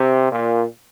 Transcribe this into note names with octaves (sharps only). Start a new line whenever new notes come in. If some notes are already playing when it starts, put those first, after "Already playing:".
Already playing: C3
A#2